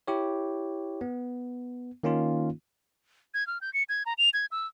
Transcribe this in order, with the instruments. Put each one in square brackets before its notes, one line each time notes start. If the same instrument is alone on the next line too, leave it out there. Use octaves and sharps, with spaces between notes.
[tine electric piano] E4 G4 C#5
B3
D#3 A#3 C#4 D#4 F4
[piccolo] G#6
F6
G6
C#7
G#6
A#5
F7
G#6
E6